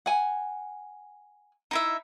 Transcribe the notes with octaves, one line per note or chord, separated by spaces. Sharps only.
F#5 G#5
D#4 E4 E5